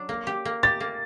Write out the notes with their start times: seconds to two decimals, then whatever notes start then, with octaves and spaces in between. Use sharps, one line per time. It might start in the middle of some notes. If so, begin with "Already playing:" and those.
Already playing: F#3 D4
0.09 A#3
0.27 G4
0.45 A#3
0.63 G4 A6
0.80 A#3